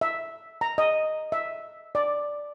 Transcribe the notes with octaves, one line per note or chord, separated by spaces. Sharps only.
E5
A#5
D#5
E5
D5